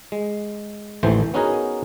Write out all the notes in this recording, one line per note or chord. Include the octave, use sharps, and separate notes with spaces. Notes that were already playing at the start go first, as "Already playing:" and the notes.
G#3
A1 D#2 E3 A3 C5
B3 C#4 D#4 F#4 G#4 A#4